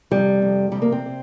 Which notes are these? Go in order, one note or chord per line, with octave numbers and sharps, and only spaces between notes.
F2 C3 G3
F2 C3
F2 C3 G3
A#3
C4
C3